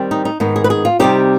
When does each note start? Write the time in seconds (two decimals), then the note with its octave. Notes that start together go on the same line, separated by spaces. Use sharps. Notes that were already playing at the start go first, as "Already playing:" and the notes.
Already playing: D#3 G3 C4
0.11 D#4
0.25 D#4
0.40 G#2 D#3 B3 D#4
0.56 G#4
0.64 B4
0.70 G#4
0.85 F4
0.99 C3 G3 C4 D#4 G4